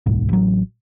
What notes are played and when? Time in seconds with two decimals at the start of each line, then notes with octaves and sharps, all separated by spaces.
0.06 D1 B1 G#2
0.29 A1 F#3